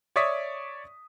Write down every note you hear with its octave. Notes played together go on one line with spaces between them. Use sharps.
C#5 D5 E5 C#6 D#6 B6